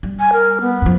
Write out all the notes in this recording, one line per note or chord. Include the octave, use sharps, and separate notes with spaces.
G3
G#5
A#4
B3
F#2 F3